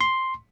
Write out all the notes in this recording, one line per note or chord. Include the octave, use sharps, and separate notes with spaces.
C6